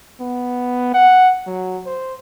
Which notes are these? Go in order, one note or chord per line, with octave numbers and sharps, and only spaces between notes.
B3
F#5
F#3
C5